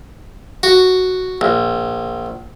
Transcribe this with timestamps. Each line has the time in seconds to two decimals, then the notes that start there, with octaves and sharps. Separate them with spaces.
0.63 F#4
1.41 A#1